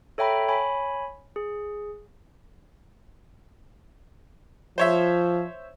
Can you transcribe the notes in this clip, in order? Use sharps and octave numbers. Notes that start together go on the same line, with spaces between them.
A4 C#5 E5 G5 A#5 B5
C#5 G#5 B5
G#4
F3 C5 C#5 E5